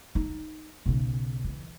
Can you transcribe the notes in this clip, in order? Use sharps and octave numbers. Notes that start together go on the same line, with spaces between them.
D#4
B1 C#3
E3